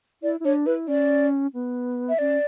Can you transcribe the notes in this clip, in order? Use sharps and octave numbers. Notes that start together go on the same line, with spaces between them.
E4 D5
E4
D4 C#5
E4 B4
C#4 D5
B3
E5
C#4 D5